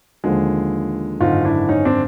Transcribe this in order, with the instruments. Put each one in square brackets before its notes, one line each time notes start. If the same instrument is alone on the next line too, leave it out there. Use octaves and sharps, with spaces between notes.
[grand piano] D#2 D3 F3 G#3
G#1 F#2 D3 D#4 F4
D4 E4
C#4 D#4
C4 D4